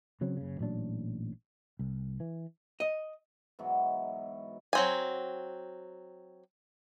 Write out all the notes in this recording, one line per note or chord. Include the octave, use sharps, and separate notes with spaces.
C#3 F#3 C4 C#4
F#1 C#3
A1 A#2 F#3 D4
C2
E3
D#5
G#2 B2 E3 F#3
F#3 C4 G#5